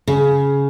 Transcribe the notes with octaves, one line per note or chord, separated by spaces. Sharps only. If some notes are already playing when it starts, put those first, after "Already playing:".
C#3